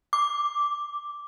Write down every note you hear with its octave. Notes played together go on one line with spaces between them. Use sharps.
D6